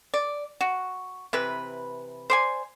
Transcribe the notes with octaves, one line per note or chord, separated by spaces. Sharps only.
D5
F#4
C3 E3 B4
C5 D5 G#5